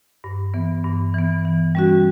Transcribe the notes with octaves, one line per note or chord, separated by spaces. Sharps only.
G2
E3 B3
G2
E3 B3
E3
G3 C#4 F#4